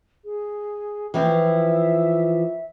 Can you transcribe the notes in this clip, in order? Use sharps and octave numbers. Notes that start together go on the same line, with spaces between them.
G#4
E3 F3 C4 E5